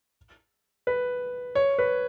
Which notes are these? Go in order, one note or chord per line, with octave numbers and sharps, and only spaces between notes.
B4
C#5
B4